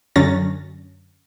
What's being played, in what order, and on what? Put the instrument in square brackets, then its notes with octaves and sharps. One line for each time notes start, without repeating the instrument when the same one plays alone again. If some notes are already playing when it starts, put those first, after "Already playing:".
[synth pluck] F#2 D3 F#3 C#4 A6 A#6